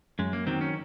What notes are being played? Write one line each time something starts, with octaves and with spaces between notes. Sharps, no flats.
F#2 G#3
A#3
D#3 F#3 C4
C#4